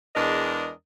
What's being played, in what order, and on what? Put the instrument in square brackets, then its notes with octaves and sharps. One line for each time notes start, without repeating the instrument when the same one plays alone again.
[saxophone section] E2 G#3 D4 A#4 D#5